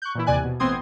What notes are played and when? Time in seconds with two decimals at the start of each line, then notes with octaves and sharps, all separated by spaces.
0.02 C#6 F#6 G6
0.15 A#2 E3 E4
0.26 D#2 C3 D5 G#5 F#6
0.44 B2
0.60 A1 B3 C4 C6 D#6 G#6